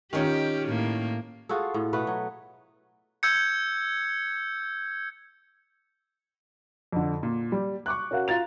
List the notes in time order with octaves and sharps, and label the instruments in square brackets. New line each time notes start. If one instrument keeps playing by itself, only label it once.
[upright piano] D#3 C#4 F4 [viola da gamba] G4
[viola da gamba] A2 A#3
[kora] F4 F#4 G#4 A4
A2
B2 A3 B3 B4
F#3
[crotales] E6 G6 G#6 C#7
[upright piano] F2 D3
A#2
G3
C#6 D6 F#6
C#4 F#4 A#4 F5 F#5
F4 A#5 A6 F7